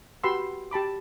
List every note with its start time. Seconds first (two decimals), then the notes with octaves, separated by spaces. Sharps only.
0.23 F#4 G4 B4 B5 C6 E6
0.71 G4 A5 B5 D6